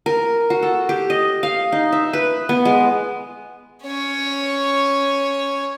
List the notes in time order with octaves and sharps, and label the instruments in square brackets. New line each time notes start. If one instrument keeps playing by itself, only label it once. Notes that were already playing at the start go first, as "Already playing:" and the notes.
[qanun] A#4
F#4
A4
G4
D#5
F5
D#4
E5
B4
B3
G#3
[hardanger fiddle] C#4 C#5